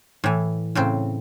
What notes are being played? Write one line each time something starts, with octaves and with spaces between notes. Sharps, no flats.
A2 E3
A2 C#3 C4